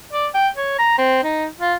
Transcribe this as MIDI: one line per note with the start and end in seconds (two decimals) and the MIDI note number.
0.13 0.27 74
0.34 0.48 79
0.56 0.78 73
0.79 0.95 82
0.98 1.23 60
1.23 1.47 63
1.60 1.75 65